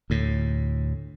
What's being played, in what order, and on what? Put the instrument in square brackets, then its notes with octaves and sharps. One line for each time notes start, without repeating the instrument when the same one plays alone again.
[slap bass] D2 A2